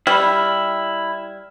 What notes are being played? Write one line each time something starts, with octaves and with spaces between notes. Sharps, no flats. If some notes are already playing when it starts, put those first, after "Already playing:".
G3 E4 F6